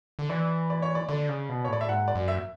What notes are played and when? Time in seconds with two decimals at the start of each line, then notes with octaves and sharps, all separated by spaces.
0.19 D3
0.29 E3 D5
0.70 D5
0.82 C#5
0.95 D5
1.09 D3 D5
1.29 C#3
1.49 B2
1.65 C#5
1.68 A2 D5
1.81 E5
1.88 G#2 F#5
2.08 D5
2.15 F#2
2.28 E5